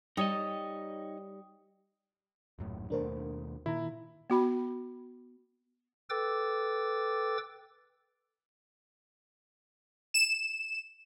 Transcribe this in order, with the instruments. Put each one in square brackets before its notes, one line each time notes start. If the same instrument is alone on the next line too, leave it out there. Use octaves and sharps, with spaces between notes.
[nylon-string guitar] G3 [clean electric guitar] D#4 C#5 D#5 [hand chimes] G4 G5 D#6
[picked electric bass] D#1 F#2 A2
[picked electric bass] D#2 B2 A3 [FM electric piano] D4 A#4 C5
[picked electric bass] A#2 [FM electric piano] D#3 A#5 [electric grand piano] E4
[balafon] B3 F#4 B5
[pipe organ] A4 B4 G5 D6 E6 A6
[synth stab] E7